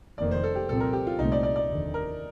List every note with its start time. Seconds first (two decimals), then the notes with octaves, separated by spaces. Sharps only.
0.18 F1 F2 D#3 A#3 D5
0.31 C5
0.44 A4
0.55 G4
0.68 C2 A#2 F3 C4 A4
0.80 A#4
0.93 G4
1.07 F4
1.19 C2 A#2 A3 C4 D#4
1.32 D5
1.43 D5
1.56 D5
1.68 F1 D#2 D3
1.94 A#4